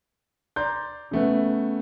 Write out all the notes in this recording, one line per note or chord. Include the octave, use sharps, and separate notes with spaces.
D5 A#5 C6 G6
C#3 A3 B3